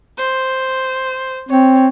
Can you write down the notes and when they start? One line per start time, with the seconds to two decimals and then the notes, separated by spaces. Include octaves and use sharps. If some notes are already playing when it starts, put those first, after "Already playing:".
0.18 C5
1.49 C4 C#5